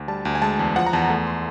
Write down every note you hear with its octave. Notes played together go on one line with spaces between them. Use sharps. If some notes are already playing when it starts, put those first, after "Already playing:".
Already playing: D2
G3 A5
D2
G#5
G#3 A5
E2
F3 F#5
A#5
E2 A5
A3
C6